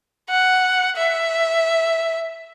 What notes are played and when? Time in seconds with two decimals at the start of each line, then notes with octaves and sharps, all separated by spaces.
0.29 F#5
0.96 E5